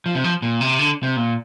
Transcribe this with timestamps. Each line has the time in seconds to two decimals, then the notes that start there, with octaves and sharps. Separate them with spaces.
0.06 F3
0.15 C3
0.24 F3
0.42 A#2
0.61 C3
0.79 D3
1.03 C3
1.16 A#2